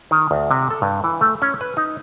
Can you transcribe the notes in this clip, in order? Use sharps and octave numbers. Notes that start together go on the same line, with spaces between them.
D#3
D2
C3
A4
G2
E3
A3
C#4
B4
D#4